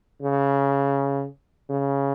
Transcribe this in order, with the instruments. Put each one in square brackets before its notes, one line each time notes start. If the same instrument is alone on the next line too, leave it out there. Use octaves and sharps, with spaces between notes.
[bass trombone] C#3
C#3